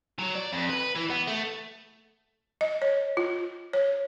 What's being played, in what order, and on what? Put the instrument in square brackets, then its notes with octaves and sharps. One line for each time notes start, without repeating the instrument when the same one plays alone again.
[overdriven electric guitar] F#3
D5
F2
B4
E3
B3
A3
[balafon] D#5
C#5
F4
C#5